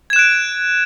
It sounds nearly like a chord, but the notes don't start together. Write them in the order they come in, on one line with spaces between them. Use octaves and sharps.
G#6 E7 F#6 D7